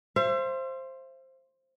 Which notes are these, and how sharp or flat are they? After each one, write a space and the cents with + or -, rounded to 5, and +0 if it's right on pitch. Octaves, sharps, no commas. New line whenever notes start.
C5 +10 E5 +45